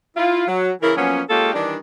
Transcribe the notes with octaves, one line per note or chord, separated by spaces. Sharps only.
E4 F4
F#3
C#3 E3 E4 A#4
F3 F#3 A#3 B3 C#4
G#3 A#3 C#4 F4 G4 A4
D#3 E3 G3 D4